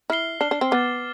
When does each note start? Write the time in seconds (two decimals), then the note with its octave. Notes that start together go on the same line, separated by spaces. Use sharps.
0.10 E4 F6 C7 G7
0.41 D4 F6 C7 G7
0.51 D4
0.61 C4
0.71 B3 D6 F6 A6